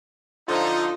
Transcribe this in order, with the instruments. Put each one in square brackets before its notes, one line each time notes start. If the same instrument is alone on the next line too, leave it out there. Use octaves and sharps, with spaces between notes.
[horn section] D3 F3 D#4 [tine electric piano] F4